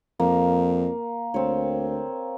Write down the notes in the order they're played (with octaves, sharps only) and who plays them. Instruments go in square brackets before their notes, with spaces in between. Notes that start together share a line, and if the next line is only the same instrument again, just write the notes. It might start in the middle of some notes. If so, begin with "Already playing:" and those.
[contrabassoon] F2 [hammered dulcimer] A#3
[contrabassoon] D2 [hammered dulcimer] C4 C#5